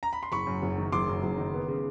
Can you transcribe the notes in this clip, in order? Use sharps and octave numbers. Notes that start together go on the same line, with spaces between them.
A#5
B5
C6
F#1 B5 C#6
F#2
F#1
D#3
F#1 C6 D6
F#2
F#1
D#3
B3
C#3